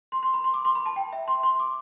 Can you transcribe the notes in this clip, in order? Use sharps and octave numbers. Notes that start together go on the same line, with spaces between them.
C6
C6
B5
C6
D6
C6
B5
A5
G5
E5
C6
C6
D6